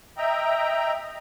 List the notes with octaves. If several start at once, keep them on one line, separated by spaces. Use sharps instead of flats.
D#5 E5 G5 A#5